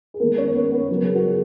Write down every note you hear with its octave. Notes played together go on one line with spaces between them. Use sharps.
G#4
D#3 G#3 A#3 B3 A#4
C#4 C#5
B3 B4
B3 B4
C#3 F#3 A#3 A#4
G#4
F#4
G#4